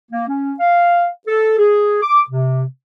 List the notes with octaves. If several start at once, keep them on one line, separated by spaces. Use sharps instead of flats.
A#3
C#4
F5
A4
G#4
D6
C3